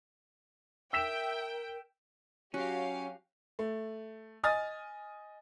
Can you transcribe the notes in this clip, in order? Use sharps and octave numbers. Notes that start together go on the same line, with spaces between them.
A#4 E5 G5 E6 B6 E7
F#3 C#4 F#4 G4 F5
A3
D#5 G#5 D#6 F6 A6